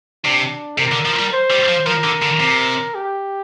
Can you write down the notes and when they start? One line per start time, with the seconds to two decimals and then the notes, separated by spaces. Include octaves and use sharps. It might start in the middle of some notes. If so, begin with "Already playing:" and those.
0.24 C3 D4
0.78 C3 A#4
0.92 D3
1.05 F3
1.19 G3
1.33 C5
1.50 G3
1.68 F3
1.87 F3 A#4
2.04 D3
2.22 D3
2.40 C3
2.95 G4